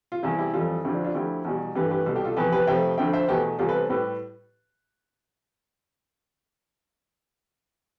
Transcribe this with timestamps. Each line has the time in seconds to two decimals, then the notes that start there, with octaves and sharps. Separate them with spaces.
0.12 F4
0.23 E2 C3 G3 E4
0.38 E4 G4
0.53 F2 E3 G3 F4 A4
0.84 D2 D3 F3 E4 G4
0.94 D4 F4
1.04 D4 F4
1.14 D2 D3 F3 A3 E4 G4
1.45 E2 B2 G3
1.75 G2 E3 A3 G4 B4
1.91 G4 B4
2.06 C2 B2 G3 A4
2.16 G4
2.25 F4 A4
2.37 E2 C3 F3 G4 B4
2.52 G4 B4
2.67 F2 C3 F3 A3 E5 G5
2.98 D2 D3 F3 E5 G5
3.13 C5 E5
3.28 E2 B2 A3 G4 B4
3.59 E2 C3 G3 F4 A4
3.69 B4
3.74 A4 C5
3.90 A2 G3 G4 B4